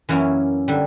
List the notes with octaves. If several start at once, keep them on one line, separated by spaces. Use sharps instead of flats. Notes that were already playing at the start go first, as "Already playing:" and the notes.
F#2 E3 A#3 C#4 E4
D3 G3